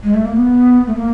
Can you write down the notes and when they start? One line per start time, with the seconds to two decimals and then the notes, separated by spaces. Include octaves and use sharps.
0.03 G#3
0.14 A3
0.25 A#3
0.36 B3
0.87 A3
0.96 A#3